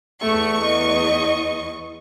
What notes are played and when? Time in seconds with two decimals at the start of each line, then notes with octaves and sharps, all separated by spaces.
0.22 E2 A3 C#6
0.64 D#5